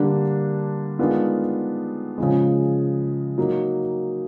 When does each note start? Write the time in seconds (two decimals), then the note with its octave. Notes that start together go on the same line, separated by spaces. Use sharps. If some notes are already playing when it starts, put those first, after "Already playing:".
Already playing: D3 G3 A#3 D4
0.99 D#3 G#3 B3 D4 F4
2.18 C#3 F3 G#3
3.38 F#3 A#3 D#4